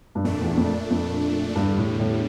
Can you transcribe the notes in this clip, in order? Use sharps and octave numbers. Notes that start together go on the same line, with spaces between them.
G2
F2 A#2 A3 D4
E2
F2
F2
E2 G2 D3 G3
A2
A2